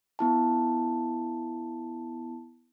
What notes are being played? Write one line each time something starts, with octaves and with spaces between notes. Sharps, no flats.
B3 E4 A5